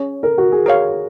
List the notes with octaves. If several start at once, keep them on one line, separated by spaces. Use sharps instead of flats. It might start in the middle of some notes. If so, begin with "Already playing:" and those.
Already playing: C#4 G#4 C#5
A#4
F#4
G#4
A#4 C#5 F5